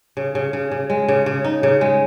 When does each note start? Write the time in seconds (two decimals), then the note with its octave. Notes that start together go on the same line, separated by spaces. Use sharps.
0.17 C#3
0.35 C#3
0.53 C#3
0.72 C#3
0.90 G#3
1.08 C#3
1.26 C#3
1.44 D#4
1.63 C#3
1.81 G#3